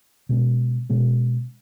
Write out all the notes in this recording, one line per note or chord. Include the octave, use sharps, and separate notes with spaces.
B2 G#3 C#4
B2 G#3 C#4